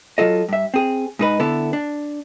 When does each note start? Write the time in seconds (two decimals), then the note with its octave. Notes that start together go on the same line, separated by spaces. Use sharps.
0.18 F#3 F4 A4 D#5
0.48 G2 E5
0.74 C4 G#4
1.19 G#2 D#4 B4
1.40 D3 B3 E4 A4
1.73 D4